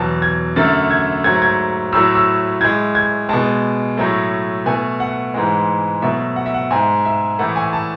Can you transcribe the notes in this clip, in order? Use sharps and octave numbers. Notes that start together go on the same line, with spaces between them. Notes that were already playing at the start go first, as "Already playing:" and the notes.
Already playing: E2 B2 F#3 A5
G#6
F#2 D3 A3 A6
G#6
G#2 F#3 A3 G#6
G#6
A2 F#3 A3 E6
E6
A2 G#3 G#6
G#6
B2 G#3 A5
A2 F#3 A3
B2 A3 G#5
F#5
G#2 E3 G#3
B2 F#3 A3 E5
F#5
E5
F#5
G#2 G#3 G#5
E5
A2 E3 A3 F#5
G#5
A5